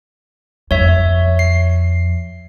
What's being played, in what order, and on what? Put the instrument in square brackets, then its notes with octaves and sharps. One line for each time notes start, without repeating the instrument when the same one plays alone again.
[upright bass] F2 [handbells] C#5 E5
[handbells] C7